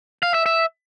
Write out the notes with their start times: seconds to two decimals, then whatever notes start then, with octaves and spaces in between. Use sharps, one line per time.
0.23 F5
0.34 E5
0.46 E5